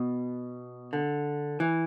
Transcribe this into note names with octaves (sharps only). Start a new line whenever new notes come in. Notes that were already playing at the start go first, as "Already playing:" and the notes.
Already playing: B2
D3
E3